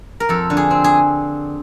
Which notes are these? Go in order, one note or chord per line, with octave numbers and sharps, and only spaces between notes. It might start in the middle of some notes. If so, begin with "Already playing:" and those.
A#4
F2 A4
D3
G#4
C4
G#4